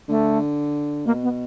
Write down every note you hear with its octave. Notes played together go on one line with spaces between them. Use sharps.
D3 A3
B2 A#3
B3